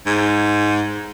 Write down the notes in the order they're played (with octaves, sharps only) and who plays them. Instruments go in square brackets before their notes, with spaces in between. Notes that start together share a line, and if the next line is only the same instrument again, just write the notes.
[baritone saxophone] G#2